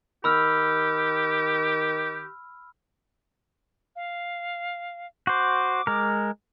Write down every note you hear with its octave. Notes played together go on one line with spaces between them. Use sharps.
D#3 G4 B5 E6 F6
F5
F#4 C5 D6
G#3 A#4